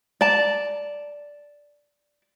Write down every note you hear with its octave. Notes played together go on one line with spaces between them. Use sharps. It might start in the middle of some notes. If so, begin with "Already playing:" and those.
D5 A5